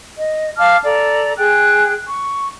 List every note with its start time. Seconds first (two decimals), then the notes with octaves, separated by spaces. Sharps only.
0.16 D#5
0.58 F5 A5 D6 F6
0.84 A4 D5 A#5
1.38 G#4 G5 F#6
2.09 C#6